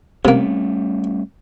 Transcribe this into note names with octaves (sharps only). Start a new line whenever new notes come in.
C3 G3 A3 A#3 C#4